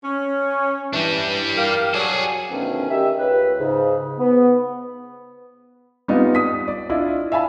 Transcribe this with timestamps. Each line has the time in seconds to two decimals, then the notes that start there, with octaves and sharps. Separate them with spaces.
0.04 C#4
0.93 E3 G3 D4
1.57 G4 A#4 F5
1.94 F#3 G#4 A4 D5
2.50 B2 D3 D#3 F3 A3 C#4
2.90 D#3 G4 E5
3.19 C#2 B4
3.59 G#2 C#3
4.18 B3
6.08 G3 B3 C4 D#4 F4
6.35 D#6 B6
6.68 D5
6.89 D4 E4 F4 D#5
7.32 E5 F5 G#5 A5 B5